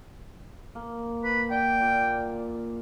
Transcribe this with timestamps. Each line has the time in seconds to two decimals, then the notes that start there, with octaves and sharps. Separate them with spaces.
0.75 A#3
1.24 B4
1.51 D5 F#5 G5
1.81 A#2